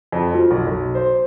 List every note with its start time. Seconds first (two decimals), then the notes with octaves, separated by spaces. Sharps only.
0.12 F2
0.35 F3
0.51 B1
0.67 B1
0.95 C5